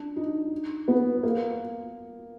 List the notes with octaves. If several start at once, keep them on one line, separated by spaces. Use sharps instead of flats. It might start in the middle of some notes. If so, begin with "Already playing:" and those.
Already playing: D4
D#4
B3
A#3